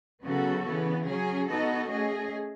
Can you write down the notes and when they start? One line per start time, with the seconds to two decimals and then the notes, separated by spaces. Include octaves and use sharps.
0.24 C#3 F#3 B3 F#4 A4
0.65 C#3 E3 B3
1.07 F#3 C#4 G#4
1.48 B3 D#4 F#4 A4 D#5
1.90 A3 C#4 G#4 D#5